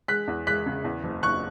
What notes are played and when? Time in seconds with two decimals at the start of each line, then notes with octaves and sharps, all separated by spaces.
0.08 G#3 F#6 B6
0.28 E2
0.47 G#3 F#6 B6
0.66 C#3
0.84 E2
1.04 F#1
1.23 F#1 C#6 F#6